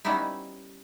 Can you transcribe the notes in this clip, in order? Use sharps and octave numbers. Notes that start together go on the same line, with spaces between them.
G3 B3 C#4 D#4 E4